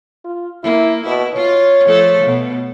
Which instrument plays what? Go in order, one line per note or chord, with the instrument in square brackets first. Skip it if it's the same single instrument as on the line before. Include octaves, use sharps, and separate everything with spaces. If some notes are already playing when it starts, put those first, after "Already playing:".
[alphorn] F4
[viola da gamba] A#3 [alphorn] E4
[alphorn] B2 [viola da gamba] E4
[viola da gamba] F4 [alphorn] C#5
[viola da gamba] F3 A3 A4
B2